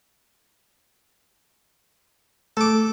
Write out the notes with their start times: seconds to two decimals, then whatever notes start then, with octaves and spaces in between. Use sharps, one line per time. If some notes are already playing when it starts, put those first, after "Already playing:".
2.57 A3 A4 D6